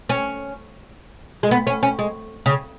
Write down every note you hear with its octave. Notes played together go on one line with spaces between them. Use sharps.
C#4
G#3
B3
C#4
C#4
G#3
C#3